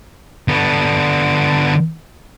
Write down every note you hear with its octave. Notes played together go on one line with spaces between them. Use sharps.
D3 B3